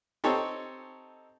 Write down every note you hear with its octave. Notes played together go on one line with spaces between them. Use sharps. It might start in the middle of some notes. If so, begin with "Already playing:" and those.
C4 D#4 G4 A4 C#5